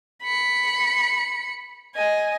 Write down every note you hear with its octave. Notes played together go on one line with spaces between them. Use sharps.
B5 C#7
D#5 G#5